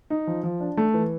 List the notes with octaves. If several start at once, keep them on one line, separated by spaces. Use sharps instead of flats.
D#4
F3
F3
D4
A3
E3